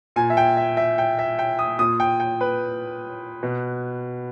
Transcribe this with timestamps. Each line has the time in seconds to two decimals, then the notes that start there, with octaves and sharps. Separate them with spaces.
0.16 A#2 G#5
0.30 E5
0.37 G5
0.57 E5
0.77 E5
0.98 G5
1.19 E5
1.39 G5
1.59 D#6
1.79 A#2 D#6
2.00 G5
2.20 G5
2.41 B4
3.43 B2